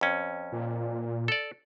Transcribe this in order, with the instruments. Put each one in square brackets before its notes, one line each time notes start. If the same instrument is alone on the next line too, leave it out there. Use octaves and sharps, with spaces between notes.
[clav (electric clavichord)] F2 C#4
[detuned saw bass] A#2
[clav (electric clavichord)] A4 D5